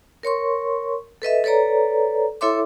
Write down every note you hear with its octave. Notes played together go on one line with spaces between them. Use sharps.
A#4 C#5 C6 C#6
A4 B4 D#5 E5
A4 B4 C#5 D5 A#5
E4 A4 C#5 E5 C6 D6